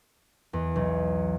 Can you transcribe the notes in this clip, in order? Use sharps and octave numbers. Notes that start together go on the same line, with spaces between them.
E2
B1